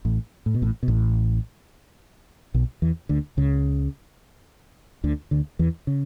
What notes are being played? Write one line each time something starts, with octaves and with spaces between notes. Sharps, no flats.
A1 A2
A2
B2
A1 A2
B2
A1 A2
B1 B2
E2 E3
D2 D3
C#2 C#3
D2 D3
D2 D3
E2 E3
C#3